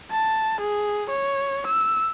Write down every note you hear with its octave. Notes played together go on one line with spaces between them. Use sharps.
A5
G#4
C#5
E6